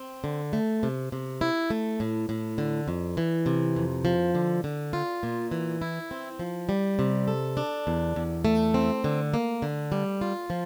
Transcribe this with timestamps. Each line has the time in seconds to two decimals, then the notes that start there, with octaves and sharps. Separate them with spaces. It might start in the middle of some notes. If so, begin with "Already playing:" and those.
Already playing: C4
0.24 D3
0.53 A3
0.83 C3
1.12 C3
1.41 E4
1.70 A3
2.00 A2
2.29 A2
2.58 D3
2.88 F2
3.17 E3
3.46 C3
3.76 F2
4.05 F3
4.35 D3
4.64 D3
4.93 F4
5.23 A#2
5.51 E3
5.82 E4
6.11 C4
6.39 F3
6.69 G3
6.99 C3
7.28 A4
7.57 D4
7.87 E2
8.16 E2
8.45 A3
8.74 C4
9.04 D3
9.34 A#3
9.62 D3
9.92 G3
10.21 F4
10.50 F3